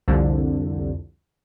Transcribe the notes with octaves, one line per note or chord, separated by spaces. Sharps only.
C2 F2 D3